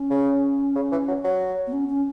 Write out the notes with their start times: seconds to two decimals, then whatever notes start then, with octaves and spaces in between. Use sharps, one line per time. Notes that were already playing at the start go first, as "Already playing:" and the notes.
Already playing: C#4
0.10 C#3
0.75 C#3
0.92 E3
1.08 F#3
1.24 F#3
1.67 B3
1.73 C#4
1.90 C#4